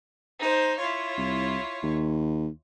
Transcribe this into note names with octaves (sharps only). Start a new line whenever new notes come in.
D#4 C5
E4 F4 C#5
C2
D#2